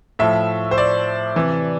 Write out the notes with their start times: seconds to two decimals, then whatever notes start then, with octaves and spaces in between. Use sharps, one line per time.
0.19 A2 F3 E5
0.71 C5
0.78 D5
1.35 C3 E3